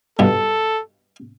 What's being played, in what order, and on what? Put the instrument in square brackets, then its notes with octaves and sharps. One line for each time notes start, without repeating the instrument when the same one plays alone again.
[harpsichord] G2 B2 [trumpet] A4